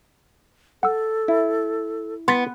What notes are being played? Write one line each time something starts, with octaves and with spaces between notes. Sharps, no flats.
A4 F#5 E6
E4
B3 C6 A6 B6